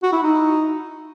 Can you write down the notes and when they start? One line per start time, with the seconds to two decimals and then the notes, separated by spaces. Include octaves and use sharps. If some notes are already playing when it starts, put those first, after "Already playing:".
0.03 F#4
0.13 E4
0.23 D#4